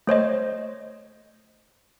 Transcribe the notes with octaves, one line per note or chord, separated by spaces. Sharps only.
A3 C5 C#5 D#5